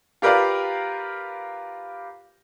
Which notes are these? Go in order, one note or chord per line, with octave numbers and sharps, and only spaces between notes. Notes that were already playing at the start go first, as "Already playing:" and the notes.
F4 G4 A#4 B4 D5 F5